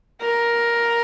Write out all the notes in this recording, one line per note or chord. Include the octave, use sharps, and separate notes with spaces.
A#4